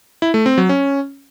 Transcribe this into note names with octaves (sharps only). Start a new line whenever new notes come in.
E4
A3
C4
F#3
C#4